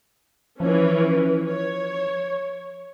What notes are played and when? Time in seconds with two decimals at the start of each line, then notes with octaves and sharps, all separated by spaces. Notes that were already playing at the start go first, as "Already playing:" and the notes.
0.60 E3 F3 C#4
1.46 C#5